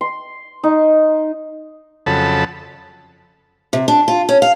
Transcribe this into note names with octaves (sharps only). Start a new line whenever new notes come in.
C6
D#4
F2 C#3 F#3 A4 A5 B5
C3
D4
F4
C#4
F5